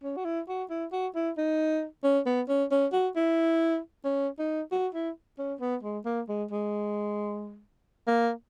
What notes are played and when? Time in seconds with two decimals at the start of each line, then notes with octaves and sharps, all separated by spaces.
0.03 C#4
0.16 F#4
0.25 E4
0.48 F#4
0.70 E4
0.92 F#4
1.15 E4
1.38 D#4
2.04 C#4
2.26 B3
2.49 C#4
2.71 C#4
2.93 F#4
3.16 E4
4.04 C#4
4.38 D#4
4.72 F#4
4.94 E4
5.38 C#4
5.61 B3
5.83 G#3
6.05 A#3
6.29 G#3
6.51 G#3
8.07 A#3